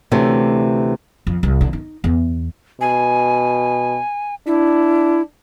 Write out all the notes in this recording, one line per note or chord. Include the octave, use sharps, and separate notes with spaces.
D2 C3 E3 A3 C#4
F2
C2
D3
D#4
E2
B2 G#5
D4 E4